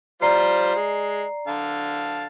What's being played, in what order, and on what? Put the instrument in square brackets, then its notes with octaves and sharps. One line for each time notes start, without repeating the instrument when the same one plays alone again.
[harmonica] G3 F4 C5 [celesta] D5 A#5 C7
[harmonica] G#3
D3 F5 A5